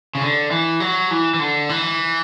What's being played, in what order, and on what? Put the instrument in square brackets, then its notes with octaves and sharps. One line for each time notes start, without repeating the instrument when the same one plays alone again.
[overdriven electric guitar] C#3
D3
E3
F#3
E3
E3
D3
E3